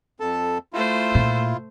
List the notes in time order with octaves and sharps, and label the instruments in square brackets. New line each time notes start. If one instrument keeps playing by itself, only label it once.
[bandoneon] F2 A4 A5
[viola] A3 C5 [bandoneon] E4 F4
[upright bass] A#2